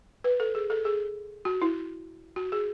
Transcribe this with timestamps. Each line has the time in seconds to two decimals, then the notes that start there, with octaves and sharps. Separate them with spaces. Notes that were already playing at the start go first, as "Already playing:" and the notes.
0.24 B4
0.40 A4
0.55 G#4
0.70 A4
0.85 G#4
1.45 F#4
1.62 E4
2.36 F#4
2.52 G#4